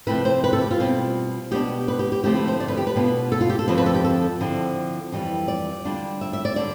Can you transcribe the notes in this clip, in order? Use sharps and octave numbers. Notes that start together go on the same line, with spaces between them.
C3 F3 A3 C4 E4 B4
C5
B4
A4
G4
F4
B2 G3 C4
B2 B3 D4 G4
B4
G4
G4
D3 F3 A3 C4 E4 G4
B4
C5
D5
B4
G4
B4
B2 B3 D4 F4
A4
F4
G4
A4
F2 D3 F3 C4 B4
B4
A4
G4
A4
D3 F3 C4 E4
F2 E3 G3
D5
D3 G3 D4 F4
E5
E5
D5
D3 G3 D5